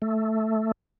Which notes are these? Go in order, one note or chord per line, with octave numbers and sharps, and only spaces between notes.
A3